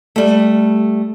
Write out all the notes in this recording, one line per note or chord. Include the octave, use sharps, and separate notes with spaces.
G3 A3